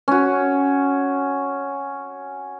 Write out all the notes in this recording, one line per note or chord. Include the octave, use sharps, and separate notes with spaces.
C#4 F#4